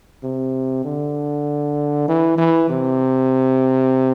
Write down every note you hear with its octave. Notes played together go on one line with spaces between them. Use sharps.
C3
D3
E3
E3
C3